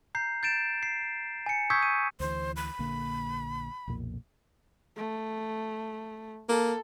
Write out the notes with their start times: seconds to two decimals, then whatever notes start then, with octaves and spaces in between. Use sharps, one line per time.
0.15 A#5 G6 C7
0.43 G6 A6 D7 E7
0.83 C7
1.46 G#5 C#7
1.70 C#6 D#6 E6 G6 G#6 B6
1.82 D#7
2.20 D2 E3 C5
2.56 B5
2.79 A#1 D3 A#3
3.88 B1 F2 A#2
4.97 A3
6.49 A#3 A4